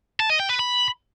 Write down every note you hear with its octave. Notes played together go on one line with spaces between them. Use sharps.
A5
D#5
G5
B4
B5